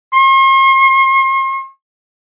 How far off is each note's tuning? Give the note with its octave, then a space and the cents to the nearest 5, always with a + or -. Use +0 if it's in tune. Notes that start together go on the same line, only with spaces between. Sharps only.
C6 +45